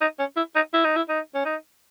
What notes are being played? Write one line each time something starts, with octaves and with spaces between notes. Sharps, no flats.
D#4
C#4
E4
D#4
E4
D#4
E4
D#4
C#4
D#4